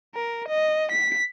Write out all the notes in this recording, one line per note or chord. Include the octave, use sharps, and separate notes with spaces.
A#4
D#5
B6